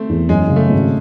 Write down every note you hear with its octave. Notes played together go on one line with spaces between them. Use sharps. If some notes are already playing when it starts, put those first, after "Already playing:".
Already playing: A3 C4
E2
F#2 G#3
C#3
A3
G#1